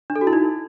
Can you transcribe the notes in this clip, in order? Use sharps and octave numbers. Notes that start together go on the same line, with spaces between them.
D4
A4
F#4
E4
D#4